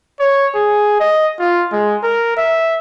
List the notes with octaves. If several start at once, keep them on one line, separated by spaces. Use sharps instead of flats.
C#5
G#4
D#5
F4
G#3
A#4
E5